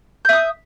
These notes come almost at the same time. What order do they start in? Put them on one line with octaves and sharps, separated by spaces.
G6 E5 D#6